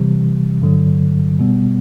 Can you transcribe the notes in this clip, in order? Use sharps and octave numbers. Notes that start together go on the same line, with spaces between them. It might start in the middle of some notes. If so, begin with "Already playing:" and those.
Already playing: C3 E3 G3
G2 D3 F#3
B2 G3 B3